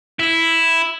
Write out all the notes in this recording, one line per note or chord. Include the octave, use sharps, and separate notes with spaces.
E4